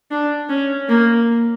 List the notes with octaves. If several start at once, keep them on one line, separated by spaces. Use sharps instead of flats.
D4
C#4
A#3